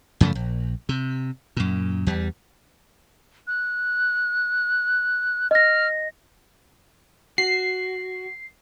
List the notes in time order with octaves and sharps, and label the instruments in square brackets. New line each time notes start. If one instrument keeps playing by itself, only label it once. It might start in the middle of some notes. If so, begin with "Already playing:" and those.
[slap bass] F#2 C#3 F3 A3
A#1
C3
F#2 A#2
E2 G3
[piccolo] F#6
[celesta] D#5 A#6 [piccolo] F6
[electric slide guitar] F#4 [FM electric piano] C7